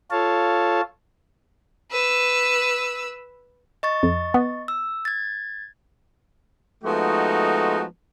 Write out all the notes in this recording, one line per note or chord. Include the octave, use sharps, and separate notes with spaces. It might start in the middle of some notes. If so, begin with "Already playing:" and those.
F4 A4 C#5 F5 A5
B4 E6
D#5 C#6 A6
F2
B3
E6
G#6 A6
F3 G#3 A3 B3 D#4 F#4